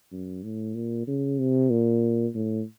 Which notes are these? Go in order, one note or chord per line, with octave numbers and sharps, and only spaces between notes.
F#2
A2
A#2
C#3
C3
A#2
A2